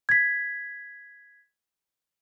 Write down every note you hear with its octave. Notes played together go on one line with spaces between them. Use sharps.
G#6 B6